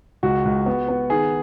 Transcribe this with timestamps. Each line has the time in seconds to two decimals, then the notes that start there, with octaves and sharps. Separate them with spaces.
0.23 C#2 F#4
0.45 C#2
0.66 B3
0.88 B3
1.10 D#3 G#4